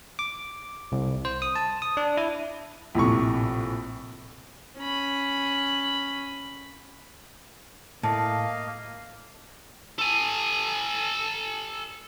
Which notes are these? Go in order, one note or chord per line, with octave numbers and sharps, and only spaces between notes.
D6
C2
C5
D#6
A5
D#6
D4
E4
A#1 A2 C3 C#6
C#4 B5
A2 A#3 D#5 F5 A5
A4 G#5